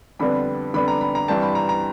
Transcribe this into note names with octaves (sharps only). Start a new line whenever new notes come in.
F2 D3 G3 B3 D4 B5
F2 D3 G3 B3 D4 B5
A#5
B5
A#5
G2 E3 G3 C4 A5
B5
A#5
A#5